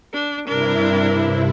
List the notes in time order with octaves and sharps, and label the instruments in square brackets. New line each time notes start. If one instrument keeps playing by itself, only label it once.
[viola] D4
[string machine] G2 C3 E4 [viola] D4 A#4